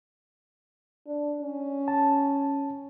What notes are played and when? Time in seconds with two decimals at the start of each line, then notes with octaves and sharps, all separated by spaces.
1.07 D4
1.42 C#4
1.88 A5